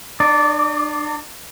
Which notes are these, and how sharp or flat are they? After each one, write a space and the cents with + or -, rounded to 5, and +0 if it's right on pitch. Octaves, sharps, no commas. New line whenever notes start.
D4 +40 D5 -15